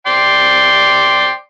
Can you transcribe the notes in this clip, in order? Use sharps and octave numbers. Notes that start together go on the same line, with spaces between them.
D5 G5 C6